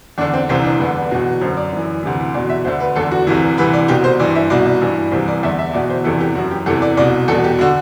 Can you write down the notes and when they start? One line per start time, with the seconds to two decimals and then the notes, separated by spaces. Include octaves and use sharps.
0.18 E2 D4
0.21 D3
0.33 C4
0.49 C2 C3 E3 C4
0.64 D4
0.80 E2 D3 B4
0.95 B4
1.11 E2 B2
1.41 F#2 C5
1.45 D3
1.57 D5
1.72 F#2 E3
2.03 D2 C3 E3
2.34 E2 B2 D5
2.49 E5
2.65 D2 D3 C5
2.80 B4
2.96 E2 D3 A4
3.11 F#4
3.27 C2 C3 E3
3.57 D2 C3 E3 B4
3.73 D5
3.88 C2 B2 G4
4.04 C5
4.19 G2 E3 D5
4.35 E5
4.50 C2 B2 D5
4.66 D5
4.81 G2 E3
5.11 C2 C3 E3 C5
5.28 D5
5.43 E2 D3 E5
5.58 E5
5.73 E2 B2 D5
5.90 C5
6.04 E2 C3 E3 A4
6.20 G4
6.35 F#2 E3 F#4
6.51 G4
6.66 E2 C3 E3 A4
6.82 D5
6.97 C2 B2 D5
7.28 E2 B2 A4
7.44 G4
7.59 D3 F#4